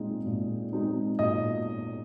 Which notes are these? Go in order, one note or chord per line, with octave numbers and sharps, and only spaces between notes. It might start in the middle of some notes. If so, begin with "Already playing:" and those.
Already playing: A#2 G#3 C4 D#4
A#2
G#3 C4 D#4
A#2 D#5